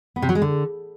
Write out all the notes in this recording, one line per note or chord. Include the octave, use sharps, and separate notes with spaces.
B3
C3
F#3
G#3
D3